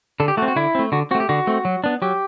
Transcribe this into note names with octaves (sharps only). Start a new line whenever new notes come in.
D3 A4
G4
A3 C4 F#4
F#4
D3 E4
A3 C4
D3 F#4
A3 C4 F#4
G4
D3 F#4
A3 C4
F#3
B3 D4
F#3 G4